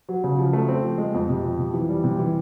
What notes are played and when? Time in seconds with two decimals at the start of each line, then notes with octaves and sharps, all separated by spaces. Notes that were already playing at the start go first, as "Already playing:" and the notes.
0.09 F#3
0.24 C#3
0.38 F3
0.53 A3
0.69 C4
0.84 F3
0.98 G#3
1.14 F2
1.29 C3
1.43 F3
1.58 C3
1.74 E3
1.89 G3
2.04 C3
2.19 E3